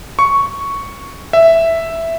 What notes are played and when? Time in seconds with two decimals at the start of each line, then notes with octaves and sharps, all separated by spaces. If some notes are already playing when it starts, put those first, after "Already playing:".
0.19 C#6
1.33 E5